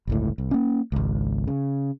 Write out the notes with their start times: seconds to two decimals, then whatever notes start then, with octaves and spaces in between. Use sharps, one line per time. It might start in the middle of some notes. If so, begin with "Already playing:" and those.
0.07 G1 C#2 A2
0.38 C2
0.51 A#3 C#4
0.92 G#1 C#2
1.47 C#3